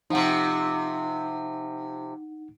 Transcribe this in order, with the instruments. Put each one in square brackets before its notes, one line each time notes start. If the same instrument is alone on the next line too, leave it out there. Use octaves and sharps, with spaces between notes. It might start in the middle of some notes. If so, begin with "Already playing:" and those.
[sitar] C3 F3 [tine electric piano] D#4 F#5